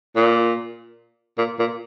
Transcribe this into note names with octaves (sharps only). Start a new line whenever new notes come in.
A#2
A#2
A#2